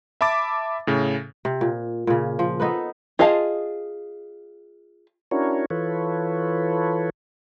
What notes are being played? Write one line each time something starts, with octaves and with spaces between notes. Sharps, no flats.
E5 A5 B5 D6 A6
A2 C#3
C3
A#2
A#2 C#3
F3
B3 D#4 A4 B4
F4 G#4 D#5 F5 A5
C#4 D4 E4 F#4 A#4 C#5
E3 F4 A4 B4 C#5